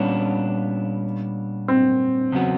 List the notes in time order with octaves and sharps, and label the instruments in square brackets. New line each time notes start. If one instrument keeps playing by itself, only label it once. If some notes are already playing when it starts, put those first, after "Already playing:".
Already playing: [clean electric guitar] A#2 G3 B3 D4 [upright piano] C#4
[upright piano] C4
[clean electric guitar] E2 C#3 F#3 B3